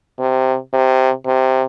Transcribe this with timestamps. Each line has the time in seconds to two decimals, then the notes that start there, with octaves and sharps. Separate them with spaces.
0.19 C3
0.73 C3
1.26 C3